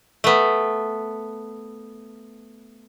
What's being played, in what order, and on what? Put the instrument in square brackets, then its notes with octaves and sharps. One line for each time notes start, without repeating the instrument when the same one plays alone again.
[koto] A3 B3